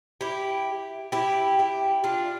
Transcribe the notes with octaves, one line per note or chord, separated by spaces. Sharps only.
E4 G4
E4 G4
E4 G4
D4 F4